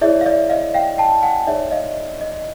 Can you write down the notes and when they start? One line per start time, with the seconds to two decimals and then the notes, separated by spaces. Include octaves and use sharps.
0.01 E4 G#4 C#5 D5 E5
0.21 F5
0.26 D5 E5
0.50 D#5 F5
0.74 F5 G5
0.98 G5 A5
1.23 F#5 G#5
1.47 D#4 G#4 C#5 D5 E5
1.71 D#5 F5
2.21 D#5